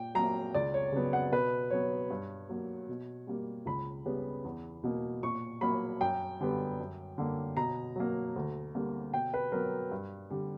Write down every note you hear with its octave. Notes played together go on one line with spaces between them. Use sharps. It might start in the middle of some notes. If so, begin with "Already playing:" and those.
Already playing: A#2 G5
F#3 A#3 A#5
C#2 D5
C#5
C#3 F#3 B3
F#5
B2 B4
F#3 B3 C#5
G2
F#3 A#3
B2
G3 A#3
C#2 B5
C#3 G3 B3
E2
B2 A#3
A#2 C#6
F#3 A#3 B5
F#2 G5
D3 G3 B3
F#2
D3 A#3
B2 A#5
F#3 A#3
D2
D3 G3 A#3
B2 G5
B4
F#3 B3 A#4
G2
D3 G3